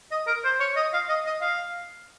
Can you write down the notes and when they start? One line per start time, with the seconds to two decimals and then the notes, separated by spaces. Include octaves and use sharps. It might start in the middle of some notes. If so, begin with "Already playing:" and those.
0.11 D#5
0.27 A#4
0.45 C5
0.60 C#5
0.76 D#5
0.94 F5
1.09 D#5
1.26 D#5
1.41 F5